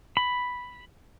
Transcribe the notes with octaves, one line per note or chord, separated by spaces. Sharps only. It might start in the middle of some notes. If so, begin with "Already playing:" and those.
B5